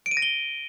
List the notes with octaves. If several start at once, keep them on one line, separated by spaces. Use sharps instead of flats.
D7
D#7
A#6
G7